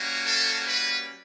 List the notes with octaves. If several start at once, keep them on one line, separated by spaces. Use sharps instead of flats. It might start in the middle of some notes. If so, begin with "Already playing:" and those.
Already playing: G3 A#3 C#4 F#4
A4
B4